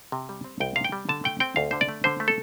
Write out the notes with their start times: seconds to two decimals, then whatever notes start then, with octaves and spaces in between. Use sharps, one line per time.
0.12 C3
0.29 G3
0.44 C4
0.60 C2 G5
0.76 C3 F5
0.84 G5
0.92 G3
1.09 D3 A5
1.24 A3 G5
1.40 C4 G5
1.56 D2 F5
1.71 D3 C5
1.81 D5
1.89 A3
2.04 D3 C5
2.20 A3
2.28 A4